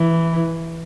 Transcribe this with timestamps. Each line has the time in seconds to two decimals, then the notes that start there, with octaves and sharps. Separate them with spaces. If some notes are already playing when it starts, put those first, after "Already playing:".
Already playing: E3